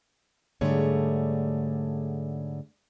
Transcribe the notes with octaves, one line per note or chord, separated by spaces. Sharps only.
G#2 D3 G3 A3 G#4 C#5